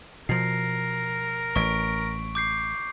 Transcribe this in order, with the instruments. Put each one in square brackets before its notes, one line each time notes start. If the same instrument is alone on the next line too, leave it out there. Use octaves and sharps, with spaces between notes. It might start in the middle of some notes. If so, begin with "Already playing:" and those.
[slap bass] B2 F3 [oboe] A#4 [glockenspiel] C7
[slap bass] A1 [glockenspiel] C#6 B6 D7
[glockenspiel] D6 G6 C7